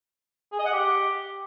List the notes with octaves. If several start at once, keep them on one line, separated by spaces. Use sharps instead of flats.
G#4
D#5
F#5
G4